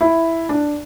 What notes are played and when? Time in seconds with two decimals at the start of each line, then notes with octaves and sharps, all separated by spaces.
0.01 E4
0.49 D4